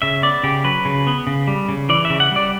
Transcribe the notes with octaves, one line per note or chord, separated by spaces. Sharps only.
C#3 E5
B3 D5
C#3 G4
F#3 B4
C#3
B3
C#3
G3
C#3
E3 D5
E5
C#3
F#5
G3 D5